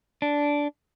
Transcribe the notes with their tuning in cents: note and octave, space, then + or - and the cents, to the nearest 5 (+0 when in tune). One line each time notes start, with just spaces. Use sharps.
D4 -10